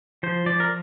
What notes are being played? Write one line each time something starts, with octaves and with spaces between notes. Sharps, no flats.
F3 C5
F3 D5
A#4